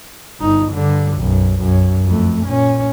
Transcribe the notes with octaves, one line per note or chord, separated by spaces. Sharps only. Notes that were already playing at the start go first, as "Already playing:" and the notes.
G1 D#4
G2 D3
B1 F#2
F#2
F2 A3
A#2 C#4